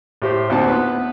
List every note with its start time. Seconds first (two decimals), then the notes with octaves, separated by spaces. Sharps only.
0.22 A2 G4 C5
0.50 D2 A#2 C4 D#4 F#5 A5
0.68 B3 B4